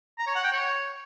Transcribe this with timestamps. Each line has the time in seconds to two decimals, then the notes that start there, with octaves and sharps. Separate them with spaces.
0.18 A#5
0.27 C#5
0.35 F#5
0.44 G5
0.52 C#5